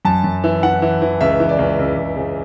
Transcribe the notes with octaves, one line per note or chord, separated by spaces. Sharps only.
F#2 A5
F#2
E3
E3 F#5
E3
E3
C#2 E5
E3
D5
C#2
C#2
C#2
C#3